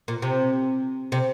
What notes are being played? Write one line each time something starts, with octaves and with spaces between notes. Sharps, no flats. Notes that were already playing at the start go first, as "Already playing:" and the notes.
A#2
C3
C3